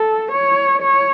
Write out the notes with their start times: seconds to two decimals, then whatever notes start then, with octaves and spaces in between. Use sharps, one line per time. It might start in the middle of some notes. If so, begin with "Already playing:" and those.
Already playing: A4
0.31 C#5
0.82 C#5